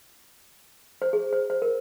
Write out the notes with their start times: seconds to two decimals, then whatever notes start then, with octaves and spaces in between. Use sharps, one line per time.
1.02 C5
1.13 G#4
1.33 C5
1.50 C5
1.62 A#4